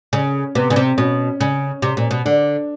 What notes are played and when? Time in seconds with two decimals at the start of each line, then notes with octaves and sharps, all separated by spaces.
0.13 C#3 C#4
0.55 C3 B3
0.70 C#3
0.76 C3 C4
0.98 B2 C#4
1.40 C#3
1.82 C3
1.97 A#2
2.11 B2
2.25 D3 D4